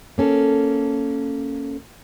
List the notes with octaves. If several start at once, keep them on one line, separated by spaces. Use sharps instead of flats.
A#3 C#4 A4